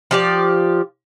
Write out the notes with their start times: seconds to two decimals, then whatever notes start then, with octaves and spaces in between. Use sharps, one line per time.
0.11 F3 G4 D5